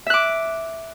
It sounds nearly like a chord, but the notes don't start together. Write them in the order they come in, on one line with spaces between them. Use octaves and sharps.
E5 F#6 D6